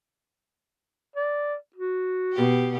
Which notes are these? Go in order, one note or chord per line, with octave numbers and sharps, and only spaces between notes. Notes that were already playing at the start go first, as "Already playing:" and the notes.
D5
F#4
B2 G4